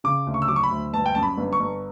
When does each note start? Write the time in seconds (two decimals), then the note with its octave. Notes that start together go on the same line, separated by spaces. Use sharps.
0.04 C#3 D6
0.27 D2
0.34 C#6
0.42 E6
0.48 F#3 D6
0.56 C#6
0.63 B5
0.71 D2
0.93 G1 A5
1.06 G5
1.15 F#2 A5
1.23 B5
1.37 G1
1.53 C#6
1.60 G1